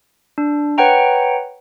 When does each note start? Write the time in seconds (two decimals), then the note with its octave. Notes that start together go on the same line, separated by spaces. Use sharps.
0.38 D4
0.78 B4 C#5 F#5 G5 A#5